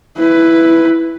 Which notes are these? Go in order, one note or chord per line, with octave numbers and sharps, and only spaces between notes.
E4 B4